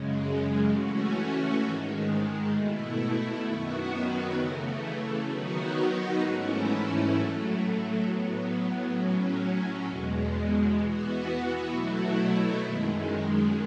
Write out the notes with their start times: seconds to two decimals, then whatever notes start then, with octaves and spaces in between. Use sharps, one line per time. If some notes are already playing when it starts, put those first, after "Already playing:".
Already playing: F#2 C#3 G#3
0.70 E3 A3 C#4 F#4
1.62 G#2 D#3 G#3
2.53 B2 A3 E4
3.45 F#2 D#3 F#3 B3 F#4
4.36 C#3 E3 A3
5.28 D#3 F#3 B3 D#4 F#4
6.19 G#2 E3 A3 C#4 E4
7.10 A2 F#3 A3
8.02 A2 F#3 B3
8.94 A2 F#3 C#4
9.85 E2 B2 G#3
10.76 E3 B3 F#4
11.68 B2 F#3 A3 E4
12.59 F#2 D#3 G#3